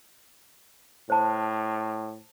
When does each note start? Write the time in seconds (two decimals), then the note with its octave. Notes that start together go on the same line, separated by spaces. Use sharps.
1.10 A2 C5 A5